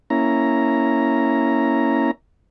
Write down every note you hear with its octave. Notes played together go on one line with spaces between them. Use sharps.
A#3 C#4 E4 A#5